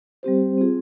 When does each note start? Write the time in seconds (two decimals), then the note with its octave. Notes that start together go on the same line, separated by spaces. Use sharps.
0.23 G3 C4 G4 C5
0.58 C4 F4 G#4